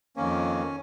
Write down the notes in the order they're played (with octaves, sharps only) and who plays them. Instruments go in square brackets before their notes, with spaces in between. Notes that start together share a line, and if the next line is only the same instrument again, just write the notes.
[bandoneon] F2 D#3 A#3 C#4